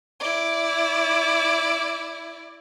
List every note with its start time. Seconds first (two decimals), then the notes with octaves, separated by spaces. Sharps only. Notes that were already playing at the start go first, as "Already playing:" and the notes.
0.20 E4 D5